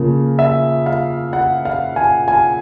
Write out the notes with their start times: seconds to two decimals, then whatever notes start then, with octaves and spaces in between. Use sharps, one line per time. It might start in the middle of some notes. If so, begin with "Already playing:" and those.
Already playing: C#3 F3 A#3
0.39 E5
0.86 F5
1.33 F#5
1.65 F5
1.96 G#5
2.28 G#5